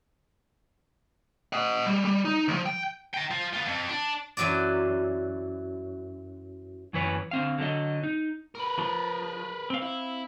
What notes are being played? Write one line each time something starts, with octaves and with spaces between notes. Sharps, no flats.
D#5 F#5
G3
G3
D#4
D2 F3
G5
G5 A#5
F3 F4
B3 F4
F2
D4
F#2 E3 F#3 F#4 D5
F#2 E3 B4 C#5
D3 C4 F5
D3 F#3 A4 D#5
D#4
A#4 B4
F3
C4 F5
E4